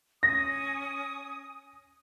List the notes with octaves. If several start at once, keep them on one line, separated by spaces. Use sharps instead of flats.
C#4 G#5 D#6 A#6